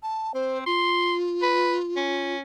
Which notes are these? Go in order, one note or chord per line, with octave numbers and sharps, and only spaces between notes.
A5
C4 C5
F4 C6
B4
C#4